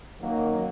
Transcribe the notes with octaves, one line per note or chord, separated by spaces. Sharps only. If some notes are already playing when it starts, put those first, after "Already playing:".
F#2 D#3 F#3 A#3